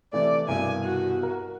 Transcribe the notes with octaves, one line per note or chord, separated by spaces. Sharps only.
C3 E3 A3 D5
C2 G2 B2 G#5
F#4
A#4